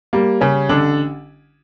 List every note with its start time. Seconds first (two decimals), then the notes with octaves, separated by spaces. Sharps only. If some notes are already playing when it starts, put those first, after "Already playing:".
0.13 G3 A#3
0.41 C#3 G3 C#4
0.69 A1 D3 D4